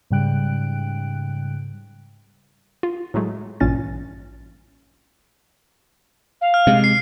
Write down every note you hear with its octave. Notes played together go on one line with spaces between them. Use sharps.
G#2 C#3 G3 G5 F#6 D7
F4
A2 F#3 G#3 A3
A1 G2 A#2 C#4 A6
F5
F6
C3 G#3
C7